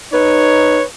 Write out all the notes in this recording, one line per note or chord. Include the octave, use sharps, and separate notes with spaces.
D#4 B4 C#5